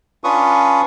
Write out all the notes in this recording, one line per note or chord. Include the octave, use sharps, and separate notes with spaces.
C#4 D4 F4 B4 C#6 D#6